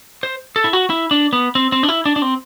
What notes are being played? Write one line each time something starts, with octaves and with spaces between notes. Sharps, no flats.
C5
A4
E4
F#4
E4
D4
B3
C4
C4
D4
E4
D4
D4
C4